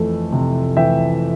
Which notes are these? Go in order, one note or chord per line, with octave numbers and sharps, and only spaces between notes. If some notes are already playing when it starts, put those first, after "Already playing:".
Already playing: F2 E3 A3
C3
E3 E5 G5